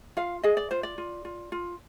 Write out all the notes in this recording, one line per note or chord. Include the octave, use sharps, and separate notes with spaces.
F4 F5
G#4 D#5
D5
F4 C5
D5
F4
F4
F4